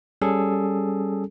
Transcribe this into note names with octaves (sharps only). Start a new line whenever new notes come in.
G3 C#4 G#4 A4